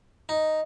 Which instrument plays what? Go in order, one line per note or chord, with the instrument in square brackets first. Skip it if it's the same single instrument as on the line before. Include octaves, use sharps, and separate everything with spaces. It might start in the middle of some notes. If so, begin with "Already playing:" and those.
[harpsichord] D#4